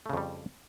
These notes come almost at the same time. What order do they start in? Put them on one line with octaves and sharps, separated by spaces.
A3 C#3 F2 G3